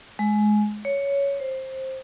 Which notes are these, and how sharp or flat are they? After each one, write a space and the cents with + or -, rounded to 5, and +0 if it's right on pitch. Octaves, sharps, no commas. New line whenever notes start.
G#3 +20
C#5 +10
C5 +15